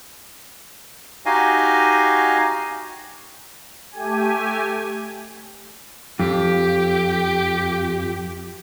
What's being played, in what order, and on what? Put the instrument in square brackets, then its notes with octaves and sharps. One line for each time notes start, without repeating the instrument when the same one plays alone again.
[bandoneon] D#4 F#4 G4 D#5 F5 G#5
[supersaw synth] A3 G4 G#5
[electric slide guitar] F2 [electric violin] G4